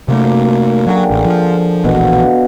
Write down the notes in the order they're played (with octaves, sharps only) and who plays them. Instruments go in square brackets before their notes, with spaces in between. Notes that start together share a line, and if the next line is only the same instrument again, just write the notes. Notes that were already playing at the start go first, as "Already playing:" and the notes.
[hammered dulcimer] F#2 A#3 D5 [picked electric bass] C3 A3
[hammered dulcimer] D3 G#4 G5 [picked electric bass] F#3
[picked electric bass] A1
F3
[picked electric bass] E1 A#1 E2 [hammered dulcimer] B2 B3
[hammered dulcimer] F5